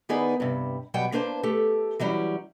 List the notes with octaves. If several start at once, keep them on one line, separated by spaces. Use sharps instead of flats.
D#3 B3 D#4 G#4 B4 D5
G2 C3
B2 F#3 G3 F#5 G5
A#3 D4 B4 C5 G5 A5
A3 G4 A4
E3 F#3 G3 C#4